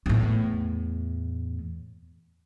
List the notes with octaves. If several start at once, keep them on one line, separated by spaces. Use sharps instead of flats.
E2 A2